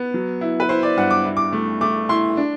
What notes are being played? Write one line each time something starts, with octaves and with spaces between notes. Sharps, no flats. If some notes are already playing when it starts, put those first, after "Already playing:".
Already playing: B3
F#3
E4
B4
E4 C5
D5
G2 F#5
D6
E4
D6
A3
A3 D6
E4 C6
D4